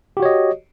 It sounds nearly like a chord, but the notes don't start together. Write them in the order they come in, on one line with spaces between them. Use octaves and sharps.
G4 F#4 C#5 D#5